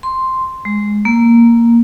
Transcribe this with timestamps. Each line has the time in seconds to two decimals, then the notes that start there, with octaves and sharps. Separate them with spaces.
0.03 C6
0.65 G#3
1.05 A#3